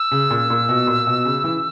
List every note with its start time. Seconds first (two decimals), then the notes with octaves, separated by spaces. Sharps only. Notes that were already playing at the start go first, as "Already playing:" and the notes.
Already playing: E6
0.12 C#3
0.30 A#2
0.50 A#2
0.69 B2
0.87 A#2
1.07 B2
1.25 C#3
1.44 E3